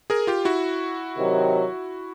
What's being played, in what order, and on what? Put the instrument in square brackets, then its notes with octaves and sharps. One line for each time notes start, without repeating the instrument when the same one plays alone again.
[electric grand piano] G#4 A#4
F4 G4
E4 F#4
[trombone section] C3 D#3 F#3